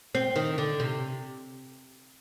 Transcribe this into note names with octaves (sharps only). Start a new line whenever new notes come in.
C4
D#3
D3
C3